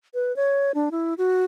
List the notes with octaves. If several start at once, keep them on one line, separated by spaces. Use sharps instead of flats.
B4
C#5
D4
E4
F#4